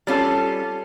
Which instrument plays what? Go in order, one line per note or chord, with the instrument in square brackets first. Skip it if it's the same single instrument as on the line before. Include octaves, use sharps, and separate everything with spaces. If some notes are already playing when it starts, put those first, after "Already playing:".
[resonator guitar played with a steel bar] G3 C#4 F4 A4